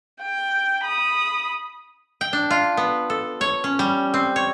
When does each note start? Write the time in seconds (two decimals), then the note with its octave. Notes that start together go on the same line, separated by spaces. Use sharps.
0.22 G5
0.84 B5 D#6
2.21 G5
2.33 D4
2.50 F4
2.77 B3
3.10 A4
3.41 C#5
3.64 C#4
3.79 G3
4.14 C4
4.36 C#5